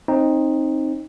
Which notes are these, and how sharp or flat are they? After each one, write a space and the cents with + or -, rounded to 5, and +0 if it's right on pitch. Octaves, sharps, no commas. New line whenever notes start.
C4 +25 D#4 +0